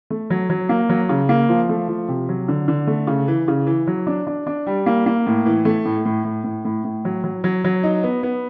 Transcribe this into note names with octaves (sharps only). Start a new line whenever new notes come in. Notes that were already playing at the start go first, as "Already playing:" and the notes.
A3
F#3
F#3
A#3
F#3
C#3
A#3
F3
A3
F3
C3
F#3
D3
D3
A3
C#3
E3
C#3
E3
F#3
D4
D4
D4
G3
A#3
A#3
A2
E3
A3
A2
A2
A2
A2
A2
A2
F#3
F#3
F#3
F#3
D#4
B3
B3